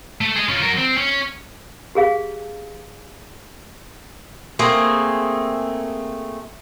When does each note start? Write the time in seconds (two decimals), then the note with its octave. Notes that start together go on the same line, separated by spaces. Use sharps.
0.21 A3
0.36 G#4 D#5
0.49 C#4 F4
0.63 F#3 A#4
0.78 C4
0.98 C#4
1.95 G4 G#4 F5
4.59 A3 A#3 C4 G#4